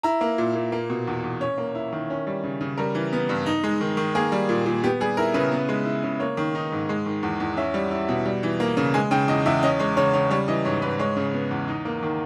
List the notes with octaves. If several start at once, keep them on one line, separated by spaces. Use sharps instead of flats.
E4 A#5
A#3
A#2
A#2
A#3
B2
E2
E2
C#4 C#5
A#3
E4
D#3
C#4
G3
C#3
C#3
G3 A#4
E3
B3
G2
D#4
G#3
D#3
D#3
A#3 G#4
G3
A#2
A#2
B3 G4
G3 G#4
E4 A#4
C#3 B4
B3
G#3
E4
C#3
A#3 C#5
D#3
D#4
G#2
G#3
D#3
E2
E2
C#4 E5
G3
E4
B2
G3
E3
A#3
C#3
G#3 G#5
C#3 G5
E2 D#5
E2 E5
C#4 D#5
G#3 C#5
C#3 C#5
C#3 C#5
G3 C#5
E3 D#5
G#2 C#5
G#2 B4
G#3 C#5
C#3
B3
E2
D#4
A#3
D#3